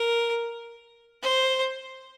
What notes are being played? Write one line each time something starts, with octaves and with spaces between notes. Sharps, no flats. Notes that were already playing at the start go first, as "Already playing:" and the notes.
Already playing: A#4
C5